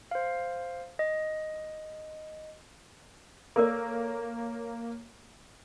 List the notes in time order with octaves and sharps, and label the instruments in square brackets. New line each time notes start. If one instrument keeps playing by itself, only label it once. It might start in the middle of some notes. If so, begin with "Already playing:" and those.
[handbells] C5 F5
D#5
[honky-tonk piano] A#3 C#5 [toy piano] A4 A#4 D5